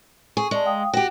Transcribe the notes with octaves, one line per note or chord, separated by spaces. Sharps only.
G#4 C#6
G#3 D5 A5
F5 G5 D#6
F#4 G4 G5